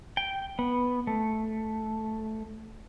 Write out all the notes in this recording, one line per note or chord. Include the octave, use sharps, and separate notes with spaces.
G5
B3
A3